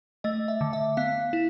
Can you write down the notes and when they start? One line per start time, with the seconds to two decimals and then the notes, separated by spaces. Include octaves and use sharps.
0.24 A3 D#5
0.48 E5
0.61 D3
0.73 E5
0.97 B3 F5
1.33 E4